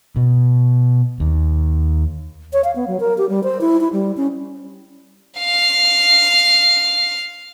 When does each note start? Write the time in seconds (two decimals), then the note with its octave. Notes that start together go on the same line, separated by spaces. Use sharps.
0.16 B2
1.20 D#2
2.53 C#5
2.64 F5
2.75 B3
2.87 F#3
3.00 A#4
3.18 G4
3.29 G3
3.43 C5
3.61 E4
3.81 E4
3.93 G3
4.17 C#4
5.39 F5 F6